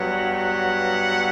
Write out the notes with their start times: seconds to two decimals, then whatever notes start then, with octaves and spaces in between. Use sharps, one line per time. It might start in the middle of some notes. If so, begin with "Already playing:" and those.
Already playing: G2 F#3 B3 F#5
0.34 F#5